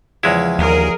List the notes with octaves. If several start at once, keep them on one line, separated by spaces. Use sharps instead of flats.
E2 C#3 F3 G#3 E4
D#2 G#4 A#4